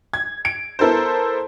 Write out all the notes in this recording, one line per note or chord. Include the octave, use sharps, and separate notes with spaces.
G#6
D7
B3 E4 A4 A#4 C5